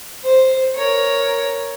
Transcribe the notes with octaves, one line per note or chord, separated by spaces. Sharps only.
C5
A#4 C#5